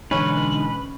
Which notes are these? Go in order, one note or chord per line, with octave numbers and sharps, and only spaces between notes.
B2 D3 E3 G#3 C#4 D#4 B4